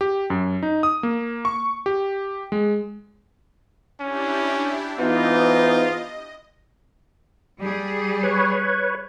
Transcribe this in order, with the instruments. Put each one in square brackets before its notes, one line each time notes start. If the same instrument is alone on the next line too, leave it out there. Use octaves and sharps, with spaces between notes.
[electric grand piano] G4
F#2
D#4
D#6
A#3
C#6
G4
G#3
[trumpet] C#4 [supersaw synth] D4 E4 G4
[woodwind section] G#2 E3 D#4 [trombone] B3 [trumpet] F4 [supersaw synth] D#5
[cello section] G3 G#4
[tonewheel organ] B4 C#5